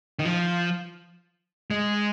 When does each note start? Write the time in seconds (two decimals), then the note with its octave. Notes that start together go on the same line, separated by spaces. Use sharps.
0.19 D#3
0.25 F3
1.70 G#3